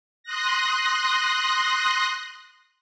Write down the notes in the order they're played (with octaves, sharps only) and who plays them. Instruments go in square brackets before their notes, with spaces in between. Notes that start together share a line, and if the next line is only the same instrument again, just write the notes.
[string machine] C6 D#6 F#6 A#6